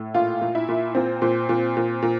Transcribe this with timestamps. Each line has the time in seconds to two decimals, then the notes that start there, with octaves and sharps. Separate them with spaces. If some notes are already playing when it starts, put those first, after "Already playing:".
Already playing: A2
0.14 A#2 F4
0.41 A#2
0.55 E4
0.69 A#2
0.95 A#2 C4
1.22 A#2
1.49 A#2
1.77 A#2
2.02 A#2